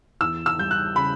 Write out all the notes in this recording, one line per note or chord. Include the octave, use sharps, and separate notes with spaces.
E2 E6
E6
G3 G6
F#6
C#3 B5